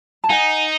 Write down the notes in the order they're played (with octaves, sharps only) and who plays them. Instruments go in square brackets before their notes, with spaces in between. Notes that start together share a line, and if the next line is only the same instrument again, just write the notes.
[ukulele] A5
[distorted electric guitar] D#4 [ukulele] F#5 G#5